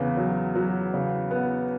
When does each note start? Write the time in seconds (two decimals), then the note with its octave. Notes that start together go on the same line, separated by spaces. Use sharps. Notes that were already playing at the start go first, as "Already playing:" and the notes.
Already playing: E2 C#3 B3
0.17 F#3
0.56 F#3
0.94 C#3
1.31 B3